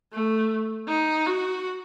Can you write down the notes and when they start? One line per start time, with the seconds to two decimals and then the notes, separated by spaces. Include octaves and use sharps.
0.13 A3
0.88 D#4
1.27 F#4